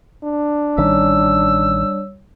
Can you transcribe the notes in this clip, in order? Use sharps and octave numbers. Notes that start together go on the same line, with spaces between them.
D4
A1 D#3 G3 C#4 C#5 E6